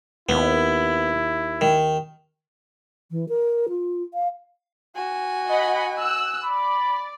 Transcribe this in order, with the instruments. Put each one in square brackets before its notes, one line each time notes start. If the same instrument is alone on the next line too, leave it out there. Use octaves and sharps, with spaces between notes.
[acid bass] D#2 [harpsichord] B3 [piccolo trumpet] E4
[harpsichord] D#3
[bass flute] E3
A#4
F4
F5
[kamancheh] F#4 G#5
[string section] D#5 F#5 B5
E6 F#6
[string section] D5 [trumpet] B5